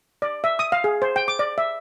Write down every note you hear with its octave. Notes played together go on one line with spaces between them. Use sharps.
D5
E5
D#6
F5
G#4
C5
G5
D6
D5
E5